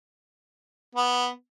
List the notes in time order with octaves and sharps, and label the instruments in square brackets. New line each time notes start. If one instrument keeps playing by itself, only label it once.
[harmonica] B3